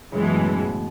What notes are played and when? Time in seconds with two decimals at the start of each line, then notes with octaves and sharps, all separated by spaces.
0.12 F#2 C#3 E3 G#3
0.22 B2
0.31 A2